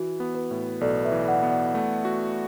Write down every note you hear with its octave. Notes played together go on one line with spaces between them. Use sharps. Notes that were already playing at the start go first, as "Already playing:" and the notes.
Already playing: E3 F#4
B3
B4
A2
B1 A4 D5
B4 E5
E3
D5 F#5
B3
D5 F#5
A3
F#4